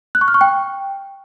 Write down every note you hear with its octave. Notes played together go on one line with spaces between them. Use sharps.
F#6
C#6
F6
C#6
G5